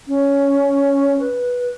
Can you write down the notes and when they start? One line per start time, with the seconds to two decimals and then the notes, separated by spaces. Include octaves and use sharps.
0.08 C#4
1.20 B4